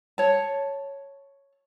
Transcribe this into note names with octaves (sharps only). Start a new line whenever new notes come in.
C#5 A5